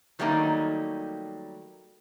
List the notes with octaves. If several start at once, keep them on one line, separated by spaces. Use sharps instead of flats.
D#3 F#3 G3 A3 A#3 D#4